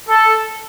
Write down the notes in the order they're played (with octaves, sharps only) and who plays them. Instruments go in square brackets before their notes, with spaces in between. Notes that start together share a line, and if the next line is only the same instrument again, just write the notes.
[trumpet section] A4